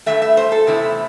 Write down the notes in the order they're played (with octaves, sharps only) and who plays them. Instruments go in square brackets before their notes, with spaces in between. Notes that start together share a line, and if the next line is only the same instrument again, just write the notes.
[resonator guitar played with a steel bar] G2 E3 A3 E5
E5
C5
A4
E2 C3 A3 E4